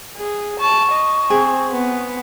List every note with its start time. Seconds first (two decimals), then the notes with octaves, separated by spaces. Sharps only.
0.17 G#4
0.60 A5 C#6
0.92 D#5
1.30 C4 G#4
1.71 B3